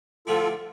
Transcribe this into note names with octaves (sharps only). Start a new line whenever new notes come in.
D3 F3 A3 E4 F4 G4 A4